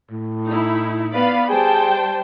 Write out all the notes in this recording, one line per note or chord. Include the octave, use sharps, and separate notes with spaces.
A2
D#4 E4
B3 B4 D5 F5 B5
G3 G#4 C5 G5 A5